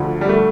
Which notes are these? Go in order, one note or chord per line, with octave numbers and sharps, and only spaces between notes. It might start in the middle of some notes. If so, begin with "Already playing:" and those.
Already playing: D2 D3 F3
G3
A3